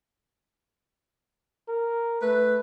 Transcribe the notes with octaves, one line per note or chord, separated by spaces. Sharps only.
A#4
A3 B4